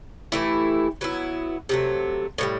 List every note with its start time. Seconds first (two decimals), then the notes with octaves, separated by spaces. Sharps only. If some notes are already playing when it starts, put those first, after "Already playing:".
0.32 E3 A3 E4 G4
1.01 F#3 B3 E4
1.69 C3 F#3 A3
2.38 A2 E3 G3